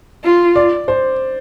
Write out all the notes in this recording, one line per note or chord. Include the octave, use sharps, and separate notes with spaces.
F4
D5
C5